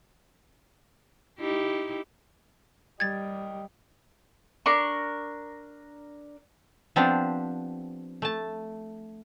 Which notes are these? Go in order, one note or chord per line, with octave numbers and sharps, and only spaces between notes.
D#4 E4 G4
G3 G4 D#5 G#6 A6
D4 A#4 C#6
F3 B3 C4 D4 G4 C5
A3 A5